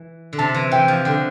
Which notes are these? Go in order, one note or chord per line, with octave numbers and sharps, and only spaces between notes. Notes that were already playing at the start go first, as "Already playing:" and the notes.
Already playing: E3
D3
C3 A5
E3
E3 G5
F3
D3 G5